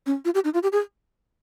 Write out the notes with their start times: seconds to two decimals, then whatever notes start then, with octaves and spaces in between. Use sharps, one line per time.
0.06 C#4
0.25 F4
0.34 G4
0.45 D#4
0.54 F4
0.63 G4
0.72 G#4